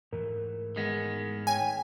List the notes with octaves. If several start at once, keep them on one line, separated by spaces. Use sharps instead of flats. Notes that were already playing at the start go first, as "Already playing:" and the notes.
G#2 E3 A3 A#4
D#3 G#3 B3
C#5 G5 G#5